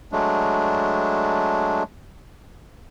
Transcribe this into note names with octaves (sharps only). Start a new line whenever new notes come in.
F#3 G#3 A3 D4